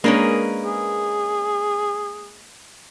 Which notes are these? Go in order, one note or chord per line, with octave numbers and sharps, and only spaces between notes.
G#3 A#3 C#4 D4 G#4 A#4 B4
G#4